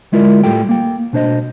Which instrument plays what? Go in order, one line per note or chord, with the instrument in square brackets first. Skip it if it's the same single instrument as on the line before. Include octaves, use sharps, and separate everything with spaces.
[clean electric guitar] D2 G#3 E4 F4 A#4 D5
A2 G3 F4 A4 G5
A#3 G5
B2 D4 C5 D#5